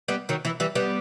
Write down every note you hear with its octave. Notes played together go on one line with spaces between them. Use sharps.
G3 B3
D#3 F#3
E3
E3 G3
G3 B3